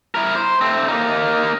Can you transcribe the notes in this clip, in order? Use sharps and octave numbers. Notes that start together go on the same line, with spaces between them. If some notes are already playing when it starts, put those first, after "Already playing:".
E4 A#4
C5
A3 C4
A#3 D#4